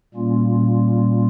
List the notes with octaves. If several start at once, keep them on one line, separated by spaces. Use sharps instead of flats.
A#2 G3 A#3 C#4 F4